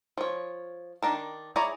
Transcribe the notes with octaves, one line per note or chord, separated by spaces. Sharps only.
F3 C#5
D#3 D4 A#4 A5
E4 G#4 C#5 D5 A#5